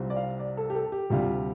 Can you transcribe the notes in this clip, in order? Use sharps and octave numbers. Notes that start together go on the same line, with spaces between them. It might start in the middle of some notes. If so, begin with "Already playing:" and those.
Already playing: C2 C3 G3 C4 F4
D5
F5
D5
A4
G4
A4
G4
D2 C3 G3 F4